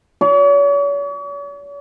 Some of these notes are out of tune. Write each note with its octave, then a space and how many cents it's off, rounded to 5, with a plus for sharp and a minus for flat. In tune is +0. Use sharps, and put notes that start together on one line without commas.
C#5 +45 C6 -10